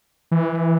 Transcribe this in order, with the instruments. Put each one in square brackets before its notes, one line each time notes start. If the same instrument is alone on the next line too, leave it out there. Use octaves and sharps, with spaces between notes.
[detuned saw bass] E3